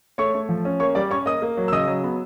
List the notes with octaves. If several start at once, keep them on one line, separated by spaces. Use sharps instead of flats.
A3 C#5 C#6
A3
F3
C#4
A#3 C#5 C#6
G3 D5 D6
C#4 C#5 C#6
A#3 D#5 D#6
A#3
F#3
E6
C#3 D#5 D#6
F#3
B3